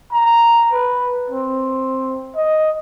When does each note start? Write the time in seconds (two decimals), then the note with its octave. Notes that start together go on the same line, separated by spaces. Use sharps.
0.12 A#5
0.73 B4
1.30 C4
2.36 D#5